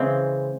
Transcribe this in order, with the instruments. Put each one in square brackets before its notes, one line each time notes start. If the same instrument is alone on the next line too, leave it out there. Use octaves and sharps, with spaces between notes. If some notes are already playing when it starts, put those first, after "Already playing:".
Already playing: [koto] C#3 E3 G#3 C4